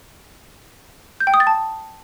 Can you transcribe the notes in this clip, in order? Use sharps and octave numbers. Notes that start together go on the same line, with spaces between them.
G6
G5
D#6
A6
A5